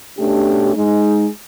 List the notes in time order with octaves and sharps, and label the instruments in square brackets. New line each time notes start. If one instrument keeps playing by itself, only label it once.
[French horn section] B2 A3 C#4 D4 G4
G#3 D#4